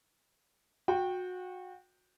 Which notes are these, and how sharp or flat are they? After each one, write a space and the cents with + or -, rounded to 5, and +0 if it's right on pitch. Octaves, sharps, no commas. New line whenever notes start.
F#4 -25 G5 +0